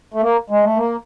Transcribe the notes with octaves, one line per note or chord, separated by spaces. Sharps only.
A3
A#3
G#3
A3
A#3